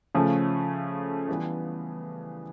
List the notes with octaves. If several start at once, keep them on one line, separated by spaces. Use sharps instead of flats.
C#3 F3 A3 C#4
E3 G3 B3